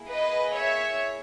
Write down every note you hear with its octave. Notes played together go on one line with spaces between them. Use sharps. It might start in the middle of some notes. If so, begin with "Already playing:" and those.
Already playing: A#3 E4 G#4
B4 D#5
C#5 E5